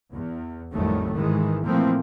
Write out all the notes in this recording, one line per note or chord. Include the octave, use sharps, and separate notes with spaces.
E2
A1 F2 D#3 F#3 G3 A3
G#2 D#3 E3 G#3
A#2 E3 F3 A3 A#3 C4